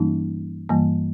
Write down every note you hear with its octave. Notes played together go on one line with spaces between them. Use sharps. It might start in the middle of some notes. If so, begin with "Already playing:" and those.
Already playing: G2 E3 G3 A#3 C#4 D#4
G2 E3 G3 A#3